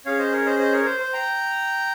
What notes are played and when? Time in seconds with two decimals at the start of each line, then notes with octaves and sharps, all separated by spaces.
0.05 C#4 G#4 C#5 F5
0.19 C5 D#5
0.33 A#4 C#5
0.46 C5 D#5
0.59 C5 D#5
0.72 A#4 C#5
0.86 C5
1.00 C5
1.13 G5 A#5